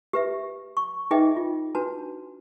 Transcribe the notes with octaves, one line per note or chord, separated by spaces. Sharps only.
G4 B4 E5
C#6
D#4 G#4 B4 D#5 E5 G5
F4
D4 F#4 B4 A5